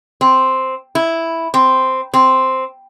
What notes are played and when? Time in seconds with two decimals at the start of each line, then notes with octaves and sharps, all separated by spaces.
0.21 C4
0.95 E4
1.54 C4
2.14 C4